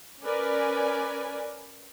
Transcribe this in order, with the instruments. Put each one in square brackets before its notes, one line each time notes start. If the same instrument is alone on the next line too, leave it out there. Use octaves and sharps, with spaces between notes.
[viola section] C#4 A#4 B4 D5 G#5